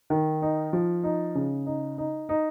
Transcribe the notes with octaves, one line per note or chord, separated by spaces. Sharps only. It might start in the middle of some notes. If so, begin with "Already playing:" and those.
D#3
D#4
F3
D#4
C#3
D#4
D#4
D#4